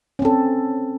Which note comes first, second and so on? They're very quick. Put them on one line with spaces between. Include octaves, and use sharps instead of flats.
C#4 C4 A4